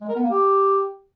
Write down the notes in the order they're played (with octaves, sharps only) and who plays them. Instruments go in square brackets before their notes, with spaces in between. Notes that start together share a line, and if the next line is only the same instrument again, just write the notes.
[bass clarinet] G#3
A#4
B3
A#3
G4